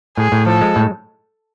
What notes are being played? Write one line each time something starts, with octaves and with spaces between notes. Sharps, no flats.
A2 G#4
A2
F3 A4
G#3
A2